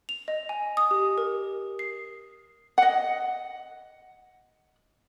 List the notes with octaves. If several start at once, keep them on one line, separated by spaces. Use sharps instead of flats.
F7
D#5
G#5
D#6
G4
A#4
C7
D#5 F#5